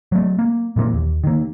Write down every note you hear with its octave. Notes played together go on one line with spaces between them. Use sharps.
F#3 A3
A#3
A#2 E3 G#3 A#3
D#2
D#3 A#3